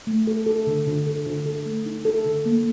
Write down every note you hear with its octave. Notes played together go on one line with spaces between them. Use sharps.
A3
A4
A4
D3
D3
A4
D3
A4
A3
D#4
A4
D3
A#3